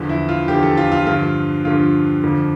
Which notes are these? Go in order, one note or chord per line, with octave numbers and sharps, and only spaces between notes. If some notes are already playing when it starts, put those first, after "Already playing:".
Already playing: E2 D3 F3
E4
F4
E2 D3 F3 G4
A4
F4
F4
G2 D3 F3 F4
G2 D3 F3 F4
F2 D3 F3